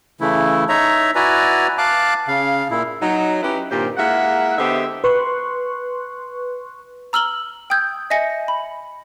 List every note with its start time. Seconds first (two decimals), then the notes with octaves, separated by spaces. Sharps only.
0.21 C#3 E3 A3 E4
0.69 D#4 C#5 E5 A#5
1.15 E4 F#4 B4 D5 G#5 A#5
1.78 F5 A5 D6 F#6
2.28 C#3 F5
2.71 A#2 E4
3.02 F#3 D#4
3.43 C#4 E4 G4 B4
3.70 G2 A#2 D#3 C4 G4 C5
3.98 G#3 A#3 E4 E5 F#5
4.58 D3 B3 G4 C5 D#5 E5
5.04 B4 C6 C#6 F#6
7.13 A#5 E6 F6 F#7 G7
7.70 G5 D#6 E6 G6 G#6
8.10 D#5 E5 G#5 A#6 C#7
8.48 B5